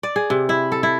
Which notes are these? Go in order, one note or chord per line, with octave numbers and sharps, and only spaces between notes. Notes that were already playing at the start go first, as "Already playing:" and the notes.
D5
G#4
C3
E4
A4
E4